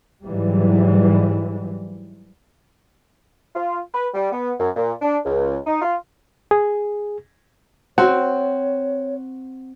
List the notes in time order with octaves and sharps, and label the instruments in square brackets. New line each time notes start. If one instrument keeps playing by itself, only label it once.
[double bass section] G#2 E3 F#3 G3
[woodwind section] F4
B4
G3
B3
F#2
A#2
D4
C#2
D#4
F4
[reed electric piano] G#4
[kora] C4 [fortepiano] F#4 [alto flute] C#5